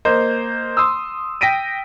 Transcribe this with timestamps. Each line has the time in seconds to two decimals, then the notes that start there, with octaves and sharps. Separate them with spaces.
0.05 A#3 C5 D#5
0.77 C6 D#6 E6
1.41 G5 A#6 B6 D7 D#7